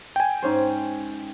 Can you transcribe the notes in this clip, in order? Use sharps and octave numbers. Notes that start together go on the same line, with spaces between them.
G5 G#5
G#2 C#4 C5